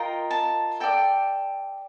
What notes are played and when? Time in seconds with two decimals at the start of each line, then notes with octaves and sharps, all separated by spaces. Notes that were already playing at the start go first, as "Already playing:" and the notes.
Already playing: F4 A#4 D#5 G5
0.31 A5
0.80 A4 D5 G5